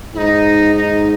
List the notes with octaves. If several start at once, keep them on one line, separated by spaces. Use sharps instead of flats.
G#2 D#4 E4
D#4